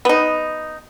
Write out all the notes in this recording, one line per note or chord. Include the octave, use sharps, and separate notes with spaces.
B3 D#4